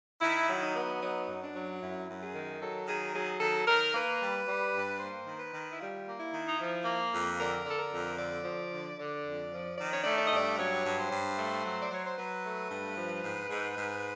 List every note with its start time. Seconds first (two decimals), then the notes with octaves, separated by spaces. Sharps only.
0.21 D#3 E4
0.48 F#3 E4
0.61 D#4
0.75 B3
1.01 F#3 D#4
1.28 F#2
1.41 D4
1.54 F#3
1.81 F#2 E4
2.07 F#2
2.20 G#4
2.33 D#3
2.61 F#3 A4
2.87 D#3 G#4
3.13 F#3 G#4
3.39 D#3 A4
3.66 D#3 A#4
3.93 A#3 B4
4.19 G3
4.47 G3
4.73 G2
4.99 A#3 C5
5.26 D#3
5.39 B4
5.53 D#3
5.70 E4
5.80 G3 F4
6.06 A#3
6.19 E4
6.32 D#3
6.46 D#4
6.58 F3 E4
6.85 A#3
7.12 F2
7.39 D3 A#4
7.65 D3 A4
7.78 A#4
7.92 F2
8.18 D3 D5
8.44 F3
8.71 D3
8.98 D3 D5
9.25 F2
9.51 F3
9.77 D#3 D5
9.91 C#5
10.03 A3 D5
10.17 D5
10.27 D#5
10.31 G2 D5
10.57 F#3 C#5
10.84 G2
10.97 C5
11.11 G2
11.37 A3
11.63 F#3
11.81 D5
11.91 F#3 C#5
12.06 C5
12.17 F#3 B4
12.44 A3
12.70 G2
12.97 F3
13.23 G#2
13.49 G#2
13.76 G#2